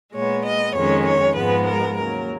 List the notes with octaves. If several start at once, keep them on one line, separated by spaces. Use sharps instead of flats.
A#2 G#3 B3 C#5
D#5
F2 D#3 G#3 C#4 C#5
C#5
G#2 F3 G#3 B3 B4
A#4
D#2 C#3 F#3 A#4